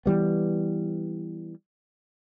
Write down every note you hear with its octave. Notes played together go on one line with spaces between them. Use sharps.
E3 G3 B3